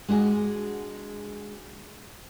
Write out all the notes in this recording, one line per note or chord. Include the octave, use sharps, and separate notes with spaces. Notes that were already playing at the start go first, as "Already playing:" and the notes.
G#3 D4 F#4 G#4